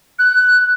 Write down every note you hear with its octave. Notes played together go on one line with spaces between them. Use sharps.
F#6